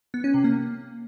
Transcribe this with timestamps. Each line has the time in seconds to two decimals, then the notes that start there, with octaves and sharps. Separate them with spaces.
0.14 B3
0.24 C#4
0.34 C3
0.44 A#3